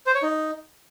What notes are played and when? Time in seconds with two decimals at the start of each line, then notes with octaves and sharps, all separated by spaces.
0.07 C5
0.15 C#5
0.23 D#4